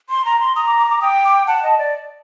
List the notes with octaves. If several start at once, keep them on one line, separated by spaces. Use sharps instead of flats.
C6
A#5
C6
A#5 D#6
D6
D6
D6
G5 D#6
D6
F#5 A5
D#5
D5